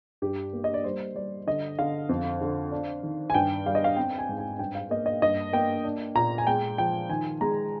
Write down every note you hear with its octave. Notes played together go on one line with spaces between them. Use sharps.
G2 G4
A#3
D#5
D5
G3 C5
G3 D5
D3 D#5
D3 F5
F2
D3
D4
D#3
G#5
G2 G5
G3 F5
D#5
F5
C4 G5
G#5
G#2
G#5
G2 G5
F5
A#3 D#5
D#5
G2 D#5
A#3 G5
D4
A#2 A#5
G#5
G#3 G5
F3 G5
D#3 G#5
G#3 A#5